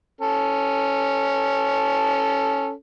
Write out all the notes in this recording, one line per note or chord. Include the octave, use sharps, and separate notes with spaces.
C#4 A4